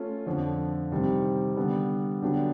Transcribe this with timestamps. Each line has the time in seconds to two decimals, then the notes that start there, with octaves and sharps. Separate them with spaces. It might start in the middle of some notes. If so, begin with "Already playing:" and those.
Already playing: A3 C#4 F4
0.26 F2 D3 F3
0.92 C3 D#3 G3 C4
1.56 D3 G3 B3
2.22 D3 F#3 B3 D4 G4